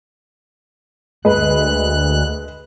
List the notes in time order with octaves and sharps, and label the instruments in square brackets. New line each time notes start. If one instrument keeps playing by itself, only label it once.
[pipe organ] D2 F#6 [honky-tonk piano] G#3 B4